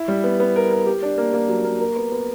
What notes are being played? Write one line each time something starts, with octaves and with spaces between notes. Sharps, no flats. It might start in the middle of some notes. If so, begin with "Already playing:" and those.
Already playing: E4
G3
B3
B3
A#4
A#4
G4
D4
A#3
A#3
F#3
A#3
A#4
B3
B3